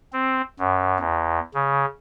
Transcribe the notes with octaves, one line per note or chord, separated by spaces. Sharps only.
C4
F#2
E2
C#3